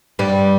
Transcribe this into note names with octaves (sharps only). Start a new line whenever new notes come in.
G2 G3